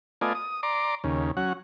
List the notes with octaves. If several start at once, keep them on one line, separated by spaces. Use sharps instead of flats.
A3 B3 F4 D5 D#5 G#5
D#6
D5 A#5 C6 D6
D#2 C#3
F#3 C#4 F#5